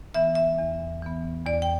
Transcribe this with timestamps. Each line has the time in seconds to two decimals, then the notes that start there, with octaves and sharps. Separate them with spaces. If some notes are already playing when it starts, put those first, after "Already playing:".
0.14 E3 B3 E5
0.35 E5
0.59 E2
1.02 E3 B3
1.46 E2 D5
1.62 G5